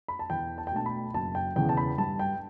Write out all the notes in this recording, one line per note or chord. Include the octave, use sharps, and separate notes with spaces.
B5
A5
E2 G5
A5
G5
B2 A3 D4 A5
B5
F#1 A5
G5
E2 C#3 E3 B3 G5
A5
B5
G2 A5
G5